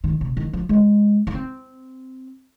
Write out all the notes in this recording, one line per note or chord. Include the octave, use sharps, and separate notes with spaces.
D#3
C3
D#3
F3
G#3
D#4
C4